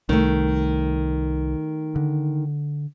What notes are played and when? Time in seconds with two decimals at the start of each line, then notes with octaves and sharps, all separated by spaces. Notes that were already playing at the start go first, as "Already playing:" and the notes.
0.09 C2 D#3 A3
1.96 D3